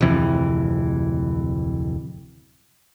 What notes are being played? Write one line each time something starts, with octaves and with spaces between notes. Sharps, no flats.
D1 F2 C3 E3